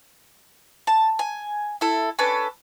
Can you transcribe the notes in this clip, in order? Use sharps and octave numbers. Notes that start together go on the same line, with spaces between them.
A5
G#5
E4 A4
C#4 D4 A4 B4